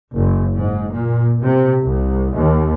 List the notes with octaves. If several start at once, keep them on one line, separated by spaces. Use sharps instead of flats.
F#1
G#2
A#2
C3
C2
D#2